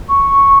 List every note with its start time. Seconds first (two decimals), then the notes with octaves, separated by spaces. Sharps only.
0.09 C#6